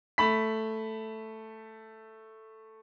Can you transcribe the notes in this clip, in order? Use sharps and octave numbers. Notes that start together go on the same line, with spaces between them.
A3 B5 B6